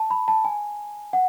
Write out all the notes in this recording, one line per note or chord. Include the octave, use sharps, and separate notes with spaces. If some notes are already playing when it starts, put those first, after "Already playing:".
Already playing: A5
B5
A5
G#5
F#5